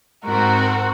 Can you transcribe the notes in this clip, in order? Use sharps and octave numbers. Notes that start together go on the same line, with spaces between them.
G#2 C4 F#4 A#4